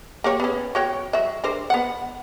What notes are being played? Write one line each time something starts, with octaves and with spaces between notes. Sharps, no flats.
A#3 G4 C#5
B3 C#4
F#4 C#5 G5
F#3 E5
D4 A#4 C5
B3 F#5